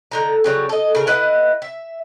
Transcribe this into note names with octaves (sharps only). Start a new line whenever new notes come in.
D3 D#4 A#5
C#3 F#3 G3
A4 D#5
C#3 A#4
E4 B4 D#5 F#5
E5